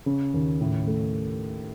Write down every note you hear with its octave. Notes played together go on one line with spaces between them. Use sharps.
C#3
D#2
A2
A3